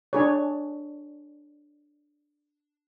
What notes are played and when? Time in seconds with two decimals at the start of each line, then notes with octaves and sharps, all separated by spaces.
0.13 D4 G#4 C#5